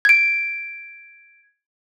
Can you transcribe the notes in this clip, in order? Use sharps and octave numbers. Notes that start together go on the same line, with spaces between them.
G#6 D7